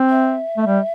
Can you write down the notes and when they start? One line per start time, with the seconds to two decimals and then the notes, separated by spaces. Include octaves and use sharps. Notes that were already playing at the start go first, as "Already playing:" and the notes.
Already playing: C4
0.10 E5
0.57 A3
0.66 G3